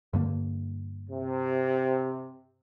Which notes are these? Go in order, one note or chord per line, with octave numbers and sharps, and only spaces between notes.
G2 D3 A#3
C3